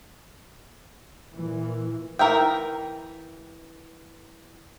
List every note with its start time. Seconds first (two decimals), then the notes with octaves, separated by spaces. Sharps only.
1.34 A#2 E3
2.19 E3 A#4 E5 G5